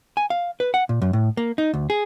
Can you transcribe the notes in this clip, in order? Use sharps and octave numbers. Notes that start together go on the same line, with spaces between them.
G#5
F5
B4
F#5
A#2
F#2
A2
A#3
D#4
D2
G#4